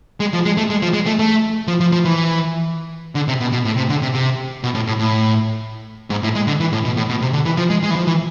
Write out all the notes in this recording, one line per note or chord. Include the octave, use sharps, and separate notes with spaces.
G#3
F3
G#3
A3
G#3
F3
G#3
A3
A3
F3
F3
F3
E3
D3
C3
B2
B2
A2
C3
D3
C3
C3
B2
A2
A2
A2
G#2
A2
G#3
D3
E3
A2
B2
A2
B2
C3
D3
E3
F3
G#3
G#3
E3
F3
E3